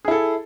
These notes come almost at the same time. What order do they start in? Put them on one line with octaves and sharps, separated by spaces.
G#4 E4 A4